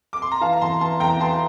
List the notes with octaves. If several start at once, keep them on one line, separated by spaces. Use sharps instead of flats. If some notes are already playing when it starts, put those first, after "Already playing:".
D6
C6
A#5
E3 F5 A5
A#5
E2 A5 C6
E3 A5 C6
E2 G5 A#5
E3 A5 C6